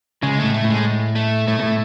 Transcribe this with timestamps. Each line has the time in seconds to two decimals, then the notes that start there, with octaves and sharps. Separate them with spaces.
0.23 C#3 G#3
0.39 A3
0.44 A2
0.54 A3
0.64 A2
0.70 G#3
1.16 A3
1.48 A2 A3
1.59 B2
1.63 A2